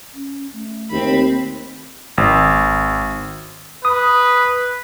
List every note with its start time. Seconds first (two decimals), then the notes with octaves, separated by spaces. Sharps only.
0.14 C#4
0.53 A3
0.91 D#2 C4 B5
2.18 G#1
3.85 B4 D#6